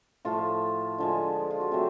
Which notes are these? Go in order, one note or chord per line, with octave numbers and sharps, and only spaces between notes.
A2 F3 A3 F4
D3 F3 G#3
F4
F#4
F#3 A3 C4 G4